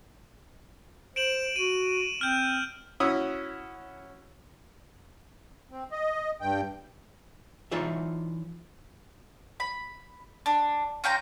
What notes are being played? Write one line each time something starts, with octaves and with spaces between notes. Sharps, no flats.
C5 D7 E7 F#7
F#4 D#7
C4 F6 G6
C#4 E4 F#4 D#6
C4
D#5
G2 G5
E3 D#4 F4 C#5 D5 E5
B5
D4
C#4 F4 G5 A#5